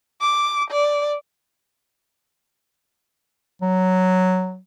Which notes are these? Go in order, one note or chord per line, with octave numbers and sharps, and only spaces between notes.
D6
D5
F#3